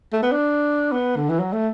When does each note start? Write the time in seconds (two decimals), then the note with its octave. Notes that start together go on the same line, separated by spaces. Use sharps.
0.13 A3
0.23 B3
0.32 D4
0.92 B3
1.16 D3
1.29 E3
1.40 F#3
1.53 A3